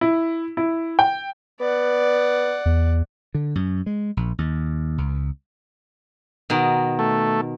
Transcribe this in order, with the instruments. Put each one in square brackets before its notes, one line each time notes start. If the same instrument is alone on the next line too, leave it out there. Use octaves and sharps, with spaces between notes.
[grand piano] E4
E4
G5
[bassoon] B3 [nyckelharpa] D5 F#5
[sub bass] E2
[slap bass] D3
F#2
G#3
A#1
D#2
C#2
[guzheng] B2 D#3
[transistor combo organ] A3